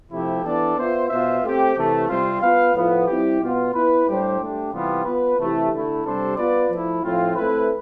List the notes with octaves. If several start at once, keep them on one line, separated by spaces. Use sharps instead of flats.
C3 F3 A3 E4 G4
E3 B3 D4 A4 D5
B3 F4 C5 E5
B2 B3 F4 C5 E5
A3 C4 G4 C5
C3 E3 A3
C3 G3 C4 F4 C5
B3 F4 B4 F5
A2 F3 B3 F4 B4
G3 C4 E4 G4
B2 B3 F4
B3 E4 B4
A2 G3 D4 G4 C5
A3 D4 G4
C3 E3 G3 B3 F4
B3 F4 B4
C3 E3 A3 E4 G4
D3 A3 E4
C3 G3 D4 A4 C5
B3 F4 B4 D5
F3 A3 E4
A2 F3 C4 F4
A3 C4 E4 B4